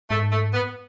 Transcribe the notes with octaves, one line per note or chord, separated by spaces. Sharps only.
G#2 A3
A3
B3